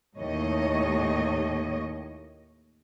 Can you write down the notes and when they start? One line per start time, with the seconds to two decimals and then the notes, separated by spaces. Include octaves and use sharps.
0.19 D#2 A2 C#5 D#5